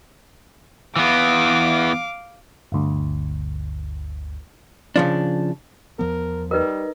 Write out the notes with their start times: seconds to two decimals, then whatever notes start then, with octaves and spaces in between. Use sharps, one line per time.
0.96 E3 B3 F5 D6
2.72 G1 D2
4.96 C#3 F3 D4
5.99 E2 F3 B3 A#4
6.51 G3 D#4 A#4 B4 D#5